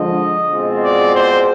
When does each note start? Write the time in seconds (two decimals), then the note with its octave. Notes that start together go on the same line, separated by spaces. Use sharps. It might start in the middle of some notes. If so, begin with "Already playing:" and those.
Already playing: D3 F3 G#3 D#5
0.52 B2 G#3 C4 F4
0.84 D5
1.15 C5